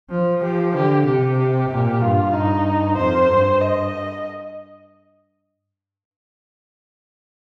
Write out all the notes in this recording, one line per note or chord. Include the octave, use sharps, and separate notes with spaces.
F3
F3 G4
D3 G4
C3 G4
G4
A#2
G2 F4
D#4
F2 C5
G2
D#5